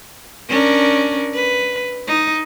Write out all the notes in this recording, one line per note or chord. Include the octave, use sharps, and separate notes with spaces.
C#4 D4 A#4
B4
D#4